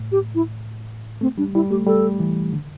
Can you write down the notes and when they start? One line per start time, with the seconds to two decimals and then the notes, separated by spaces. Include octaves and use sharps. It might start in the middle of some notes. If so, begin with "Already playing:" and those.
Already playing: A2
0.12 G4
0.35 E4
1.21 A3 C4
1.38 G3 D4
1.55 G3 E4
1.70 A3 G4
1.87 G3 A4
2.20 E3
2.53 D3